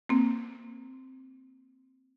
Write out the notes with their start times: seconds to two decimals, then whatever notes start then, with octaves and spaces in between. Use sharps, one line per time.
0.09 A#3 C4